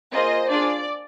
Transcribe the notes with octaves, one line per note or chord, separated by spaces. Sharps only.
A#3 F4 G#4 C5 D#5
D4 F4 G#4 D5